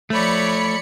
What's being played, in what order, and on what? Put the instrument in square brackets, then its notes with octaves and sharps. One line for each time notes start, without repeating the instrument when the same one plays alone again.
[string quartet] F3 C#5 D5 [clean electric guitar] A3 [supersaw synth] B5 C#7